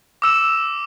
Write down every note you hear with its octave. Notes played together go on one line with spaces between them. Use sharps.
D6 E6 E7